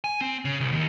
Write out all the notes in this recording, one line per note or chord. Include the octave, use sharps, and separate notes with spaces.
G#5
C4
C#3
C2
D#2